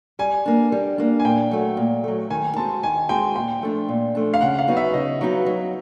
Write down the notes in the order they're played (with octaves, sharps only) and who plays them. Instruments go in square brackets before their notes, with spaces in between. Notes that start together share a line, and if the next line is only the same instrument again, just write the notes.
[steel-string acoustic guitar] G3 [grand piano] G#5
[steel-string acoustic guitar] A#3 D4
G3
A#3 D4
[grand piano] G#5
[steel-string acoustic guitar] A#2 [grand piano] G5
[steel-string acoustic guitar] F#3 A3
A#2
F#3 A3
[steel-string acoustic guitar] D#3 [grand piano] G#5
[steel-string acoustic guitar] G#3 C4 D#4 F#4 [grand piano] A5
[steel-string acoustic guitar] D#3 [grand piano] G#5
[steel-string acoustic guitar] G#3 C4 D#4 F#4 [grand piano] G5
[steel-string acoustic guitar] A#2 [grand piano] G5
[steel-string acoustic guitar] F3 A3 D4
A#2
F3 A3 D4
[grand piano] F5
[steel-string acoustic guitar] C#3 [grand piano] F#5
[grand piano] F5
[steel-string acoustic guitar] F#3 B3 D#4 F#4
[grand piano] E5
[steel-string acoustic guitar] C#3 [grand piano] D#5
[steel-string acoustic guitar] F#3 B3 D#4 F#4
F#3